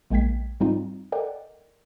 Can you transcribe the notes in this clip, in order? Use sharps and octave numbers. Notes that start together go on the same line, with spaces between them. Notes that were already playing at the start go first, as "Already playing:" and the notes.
A#1 G#3 A#3 G5 G#6 B6
G#2 G3 C4 D#4 F4
A4 A#4 D5 D#5 F#5 G5